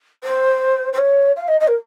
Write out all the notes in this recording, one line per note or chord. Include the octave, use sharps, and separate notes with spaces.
C5
C5
C#5
F5
D#5
D#5
A#4